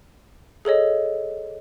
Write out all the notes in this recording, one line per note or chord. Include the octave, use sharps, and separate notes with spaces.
G#4 A4 C#5 D#5